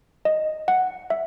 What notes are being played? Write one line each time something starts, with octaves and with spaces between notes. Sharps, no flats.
D#5
F#5
E5